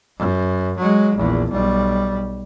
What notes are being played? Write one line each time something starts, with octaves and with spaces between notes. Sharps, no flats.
F#2
F#3 G#3
A#1 E2
B1 G3